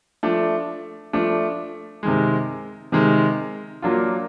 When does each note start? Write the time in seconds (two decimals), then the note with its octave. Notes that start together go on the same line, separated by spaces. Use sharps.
0.23 F3 A3 D4
1.13 F3 A3 D4
2.03 C3 D#3 G#3
2.92 C3 D#3 G#3
3.82 F#3 A#3 D4 F4